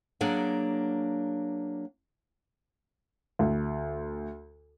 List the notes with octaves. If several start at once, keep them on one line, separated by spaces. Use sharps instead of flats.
F#3 A#3 D4 G#4 F#5
D2